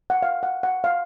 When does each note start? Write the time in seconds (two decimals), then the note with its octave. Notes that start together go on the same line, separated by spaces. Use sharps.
0.10 F#5
0.22 F5
0.43 F#5
0.63 F#5
0.84 F5